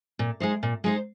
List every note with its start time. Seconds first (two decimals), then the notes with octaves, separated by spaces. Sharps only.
0.19 A#2
0.40 G#3 D#4 C5
0.63 A#2
0.84 G#3 D#4 C5